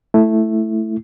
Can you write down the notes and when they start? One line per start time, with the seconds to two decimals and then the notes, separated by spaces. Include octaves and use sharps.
0.14 A3 E4